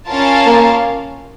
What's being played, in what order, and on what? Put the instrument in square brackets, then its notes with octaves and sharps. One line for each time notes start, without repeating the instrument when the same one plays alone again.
[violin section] C#4 F4 A#4 F5 A5
[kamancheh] A#3